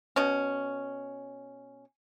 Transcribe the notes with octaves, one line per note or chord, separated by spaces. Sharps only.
B2 C#4